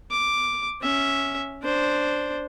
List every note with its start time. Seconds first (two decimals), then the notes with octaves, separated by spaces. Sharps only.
0.11 D6
0.81 C#4 E5
1.63 D4 C5